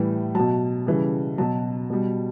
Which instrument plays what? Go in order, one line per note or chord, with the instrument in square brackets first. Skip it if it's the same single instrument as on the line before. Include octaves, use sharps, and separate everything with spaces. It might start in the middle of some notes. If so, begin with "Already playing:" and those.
Already playing: [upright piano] A2 E3 G3
B2 F#3 A5
C#3 E3 G3
B2 F#3 A5
B2 G3